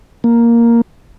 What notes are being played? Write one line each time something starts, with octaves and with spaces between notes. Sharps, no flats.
A#3